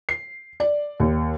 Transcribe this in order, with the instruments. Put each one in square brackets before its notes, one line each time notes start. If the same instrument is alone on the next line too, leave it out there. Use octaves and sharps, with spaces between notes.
[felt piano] C7
D5
D#2